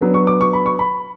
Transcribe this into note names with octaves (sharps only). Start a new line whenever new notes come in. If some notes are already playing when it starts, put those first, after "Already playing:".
F#3 B3 D4
C#6
D6
C#6
B5
C#6
B5